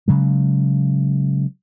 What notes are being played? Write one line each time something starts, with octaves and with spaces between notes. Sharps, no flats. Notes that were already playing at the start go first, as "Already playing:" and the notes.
C#3 F#3 G#3